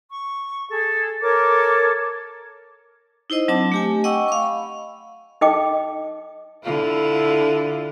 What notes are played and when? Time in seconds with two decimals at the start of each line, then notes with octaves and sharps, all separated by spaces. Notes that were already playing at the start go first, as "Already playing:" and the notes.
0.10 C#6
0.70 G#4 A4
1.22 A4 A#4 C#5 D6
3.30 D#4 E4 C5 D#5
3.48 F#3 C4 D4 A5 D6
3.72 A3 G4 G#5
4.04 D#5 F#5 G5 C#6 D6 E6
4.28 F5 C#6
4.42 B5
5.41 D#4 A4 D#5 G5 D6
6.63 D3 E4 F4